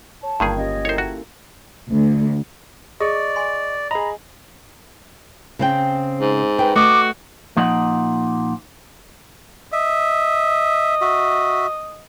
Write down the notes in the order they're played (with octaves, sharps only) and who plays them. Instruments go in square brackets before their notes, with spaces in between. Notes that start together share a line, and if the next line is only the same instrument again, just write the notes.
[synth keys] C#5 [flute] A5
[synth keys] G1 G5 G#6 [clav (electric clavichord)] G2 D#3 G#4 [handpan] A#3 F4
[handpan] C#4 G4 [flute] D#5
[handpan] E4 A4 A#4 [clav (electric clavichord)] C5 C#5
[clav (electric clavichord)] F#4
[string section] D2
[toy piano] G#4 D6 [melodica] D5 [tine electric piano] D#5 [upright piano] C#6
[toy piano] G#5 C6
[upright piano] G#4 D#5 [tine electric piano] A#5 B5
[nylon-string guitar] C#3 C4 G5
[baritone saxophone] G#2
[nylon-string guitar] B4 G5
[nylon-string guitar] A3 D#5 [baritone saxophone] F#4 [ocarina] D6
[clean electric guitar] A#2 F3 A#3 D#4 D#5 F#5
[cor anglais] D#5 [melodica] E5
[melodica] F#4 E5